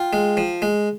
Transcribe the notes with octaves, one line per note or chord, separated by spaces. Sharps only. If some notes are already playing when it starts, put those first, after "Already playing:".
Already playing: F4 G5
G#3
F3
G#3